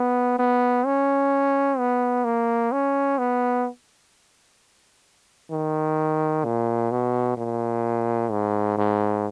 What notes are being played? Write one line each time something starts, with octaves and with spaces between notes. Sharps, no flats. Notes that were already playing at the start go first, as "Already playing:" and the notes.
Already playing: B3
B3
C#4
B3
A#3
C#4
B3
D#3
A#2
B2
A#2
G#2
G#2